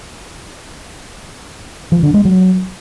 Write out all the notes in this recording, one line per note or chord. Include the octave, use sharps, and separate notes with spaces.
F3
D3
G#3
F#3